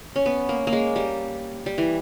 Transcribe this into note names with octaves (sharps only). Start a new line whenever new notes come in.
C#4
B3
A#3
A#3
G#3
G3
G3
E3